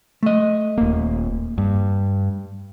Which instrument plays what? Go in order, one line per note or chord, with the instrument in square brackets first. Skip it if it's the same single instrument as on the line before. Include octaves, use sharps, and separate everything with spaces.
[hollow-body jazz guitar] A3 D#5
[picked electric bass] D#1 A#3
G2